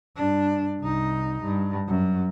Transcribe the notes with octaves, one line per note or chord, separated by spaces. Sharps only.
G2 D4
C2 D#4
G2
F#2